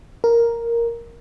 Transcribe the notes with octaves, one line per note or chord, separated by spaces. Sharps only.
A#4